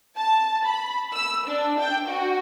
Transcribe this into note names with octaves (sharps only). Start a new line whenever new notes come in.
A5
B5
E6
D4
G5
F#4